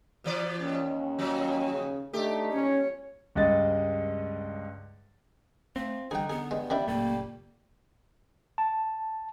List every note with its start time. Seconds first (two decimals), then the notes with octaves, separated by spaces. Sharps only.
0.24 B2 E3 D5
0.60 D#2 C#4
1.19 F3 F#3
1.71 C#3
2.13 A3 D4 D#4 G4
2.52 C#4 C#5
3.35 C#2 G2 G#3 D#5 A6
5.76 F3 A3 C4
6.11 D3 G3 D#4 G#4 G5
6.30 B3 G#4
6.51 G2 G#3
6.70 D#3 G3 D4 E4
6.88 F#1 A#2 G3 A3 A#3
8.58 A5